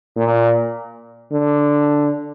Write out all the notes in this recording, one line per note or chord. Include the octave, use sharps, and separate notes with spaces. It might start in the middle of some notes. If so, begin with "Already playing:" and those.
A#2
D3